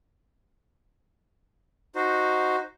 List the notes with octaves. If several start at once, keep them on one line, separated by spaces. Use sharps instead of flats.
D#4 F#4 C5